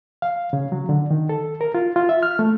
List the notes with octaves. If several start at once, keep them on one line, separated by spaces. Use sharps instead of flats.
F5
C#3
F#3
D3
D#3
A4
A#4
F4
F4
E5
F6
A3